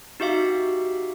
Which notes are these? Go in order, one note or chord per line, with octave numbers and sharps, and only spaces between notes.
D#4 F#4 G4 E5 F5